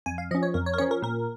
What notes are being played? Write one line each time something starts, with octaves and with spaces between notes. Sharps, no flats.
F2 G#5
F5
F3 C#4 D#5
C#5
F2 A#4
C#5
A#4
F3 C#4 C#5
A#4
A#2 A#4